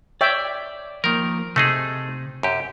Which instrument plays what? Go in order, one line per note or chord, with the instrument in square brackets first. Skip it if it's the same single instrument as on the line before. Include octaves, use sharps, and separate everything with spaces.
[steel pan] C#5 E5 G5 [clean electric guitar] D5
[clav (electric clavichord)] D#3 A#4 [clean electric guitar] F3 A#3
[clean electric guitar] C3 [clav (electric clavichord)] A3 D#4 G#4
[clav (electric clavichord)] F#2 G4